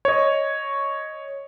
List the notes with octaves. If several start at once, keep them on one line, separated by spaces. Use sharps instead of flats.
C#5 D#5